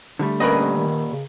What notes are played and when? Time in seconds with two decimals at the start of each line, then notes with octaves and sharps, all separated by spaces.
0.19 D3 G3 A3
0.40 A#2 C#4 G4 A#4 B4 D#5 B5
0.76 D#3
1.13 C#3